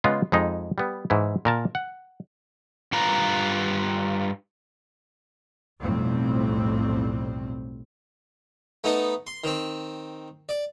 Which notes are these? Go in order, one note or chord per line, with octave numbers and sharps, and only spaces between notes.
C#3 G#3 B3 F4 G#4
F2 G#3 D#4
G3 B3
G#2 E3 E4
A#2 A#4 A5
F#5
G2 F4 B4 A#5
B1 F2 A2 G3 C4
A3 B3 D#4 A4
C6
D#3 C4
D5